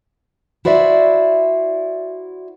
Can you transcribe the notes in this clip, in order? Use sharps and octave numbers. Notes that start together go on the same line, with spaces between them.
E4 F#4 C5 D5 E5